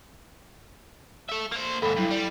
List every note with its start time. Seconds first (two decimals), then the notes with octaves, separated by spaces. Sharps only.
1.29 A4 E5
1.52 A#3 C5
1.82 D#2 G#2 A4 B5
1.96 G2 F#3 E4
2.11 G3